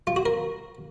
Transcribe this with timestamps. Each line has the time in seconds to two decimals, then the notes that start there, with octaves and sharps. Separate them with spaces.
0.07 F4
0.16 F#4
0.26 A#4